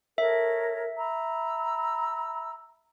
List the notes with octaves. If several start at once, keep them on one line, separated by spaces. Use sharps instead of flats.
A4 A#4 C#5 E5
A#5 B5 E6